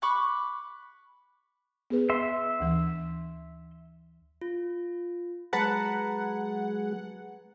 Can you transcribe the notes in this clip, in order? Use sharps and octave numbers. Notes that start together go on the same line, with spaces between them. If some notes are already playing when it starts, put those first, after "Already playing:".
B5 C#6 D6 F#6
B3 G#4 B4
E5 C6
D2 E3
F4
F#3 G#3 G#4 B4 F#5 A5 A#5